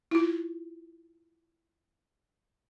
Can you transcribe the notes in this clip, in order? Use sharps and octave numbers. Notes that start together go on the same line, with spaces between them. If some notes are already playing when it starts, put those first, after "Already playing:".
E4 F4